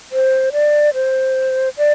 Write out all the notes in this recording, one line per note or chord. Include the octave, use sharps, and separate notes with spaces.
C5
D5
C5
D5